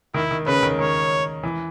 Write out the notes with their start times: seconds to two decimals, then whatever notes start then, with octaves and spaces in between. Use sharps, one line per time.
0.14 D#3 E4
0.31 D#3
0.46 C#3 B4
0.63 D#3
0.79 D#3 C#5
1.43 E3